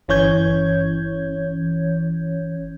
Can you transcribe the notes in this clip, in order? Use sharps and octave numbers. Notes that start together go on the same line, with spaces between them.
G1 E3 C#4 C#5 G6 G#6